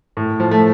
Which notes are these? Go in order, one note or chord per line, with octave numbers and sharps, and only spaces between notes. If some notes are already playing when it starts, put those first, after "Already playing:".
A2
F3
A3